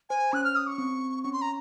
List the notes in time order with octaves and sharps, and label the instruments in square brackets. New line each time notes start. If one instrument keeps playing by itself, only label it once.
[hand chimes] C5 [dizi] G#5
[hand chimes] C#4 [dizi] F#6
[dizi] F6
D#6
C#6
[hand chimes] C4
[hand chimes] C#4 [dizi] C#6
[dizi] C6
[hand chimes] C#4 [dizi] A#5